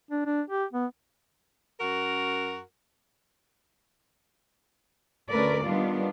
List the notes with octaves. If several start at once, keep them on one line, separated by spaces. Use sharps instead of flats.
D4
D4
G4
B3
F#2 F#4 A#4
D2 A3 C#4 A#4 B4 D5
D#3 G3 B3 D4 F4